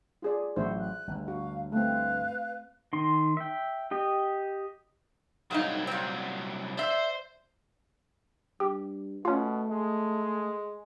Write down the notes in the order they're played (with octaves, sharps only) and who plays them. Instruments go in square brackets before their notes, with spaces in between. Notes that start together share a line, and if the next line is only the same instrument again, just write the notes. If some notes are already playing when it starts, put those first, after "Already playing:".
[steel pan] F4 G#4 D5
[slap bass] A1 A2 F#3 [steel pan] C5 E5 [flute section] F#5
[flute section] F#6
[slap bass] G1 D2
[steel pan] F#4 [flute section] F5
[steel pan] A3 C4 [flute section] B4 F5 F#6
[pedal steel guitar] D#3 C6
E5 G5
G4 D#5
[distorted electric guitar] C2 F#3 [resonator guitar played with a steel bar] G#2 A#3 D#4
[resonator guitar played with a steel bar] A#2 C4
[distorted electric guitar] C5 C6 [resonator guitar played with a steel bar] D5 E5
[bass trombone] G2 [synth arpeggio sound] G4
[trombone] B2 [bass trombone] A3 [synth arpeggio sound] C#4 F4
[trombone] G#3